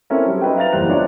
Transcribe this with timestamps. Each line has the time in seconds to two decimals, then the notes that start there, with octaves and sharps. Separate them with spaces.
0.10 C4 C#4 E4 A4 A#4
0.26 F#3 G3
0.41 D#4 B4 G5
0.57 E5 F5 A#5 A6 F7
0.73 F#1 E2 G3 C5 F#6 F7
0.90 D4 D#4 F4 C#5